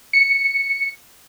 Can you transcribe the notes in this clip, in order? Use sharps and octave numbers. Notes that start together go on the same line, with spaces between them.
C#7